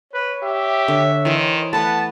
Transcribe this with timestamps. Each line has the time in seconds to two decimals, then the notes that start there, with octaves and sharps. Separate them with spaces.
0.13 B4 C#5
0.43 G4 E5
0.88 D3
1.25 D#3 E3 C5
1.73 A3 B3 B4 F#5 A5